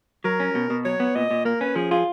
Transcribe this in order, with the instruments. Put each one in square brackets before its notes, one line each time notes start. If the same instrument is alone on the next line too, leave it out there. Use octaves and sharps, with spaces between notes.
[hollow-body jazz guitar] F#3 [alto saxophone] A#4
[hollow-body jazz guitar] C#4
B2
B2
[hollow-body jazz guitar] F#3 [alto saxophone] C#5
[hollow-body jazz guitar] B3
[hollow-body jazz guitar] A#2 [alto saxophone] D#5
[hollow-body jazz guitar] A#2
[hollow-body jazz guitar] A#3 [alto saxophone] A#4
[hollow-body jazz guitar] C#4 [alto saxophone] B4
[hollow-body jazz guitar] F3 [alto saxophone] G#4
[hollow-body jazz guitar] F4 [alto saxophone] G#4